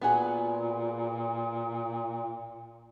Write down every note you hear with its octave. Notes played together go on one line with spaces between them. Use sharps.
A#2 B3 F#4 G#4